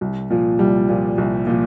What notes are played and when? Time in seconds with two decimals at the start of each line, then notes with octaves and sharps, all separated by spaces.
0.01 C2
0.30 A#2 F3
0.59 C2 G3
0.89 A#2 F3
1.18 C2
1.47 A#2 F3